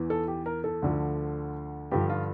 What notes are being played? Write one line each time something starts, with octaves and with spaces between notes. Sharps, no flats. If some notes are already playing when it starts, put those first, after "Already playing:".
Already playing: E2 E3
A4
G4
A#4
A4
D2 D3 F3
G2 D3 F3 G4
F4